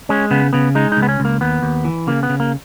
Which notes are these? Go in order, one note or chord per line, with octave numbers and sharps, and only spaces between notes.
G#3 C#4
C#3 B3
C#3 B3
G#3 D#4
D#4
C#2
B3
C#4
C#2 A#3
D#2 B3
D#2
E3
C#3 A#3
B3
C#3
A#3